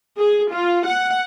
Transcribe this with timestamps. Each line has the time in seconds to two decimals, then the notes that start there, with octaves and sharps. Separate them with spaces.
0.18 G#4
0.52 F4
0.86 F#5